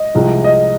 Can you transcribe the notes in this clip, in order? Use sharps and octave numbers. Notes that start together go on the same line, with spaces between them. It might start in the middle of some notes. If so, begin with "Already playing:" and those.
Already playing: D#5
C2 C3 F3 G#3
D#5